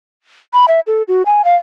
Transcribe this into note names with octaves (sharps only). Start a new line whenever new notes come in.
B5
E5
A4
F#4
G#5
F5